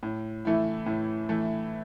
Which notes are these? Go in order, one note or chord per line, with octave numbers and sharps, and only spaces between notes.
A2
E3 A3 E4
A2
E3 A3 E4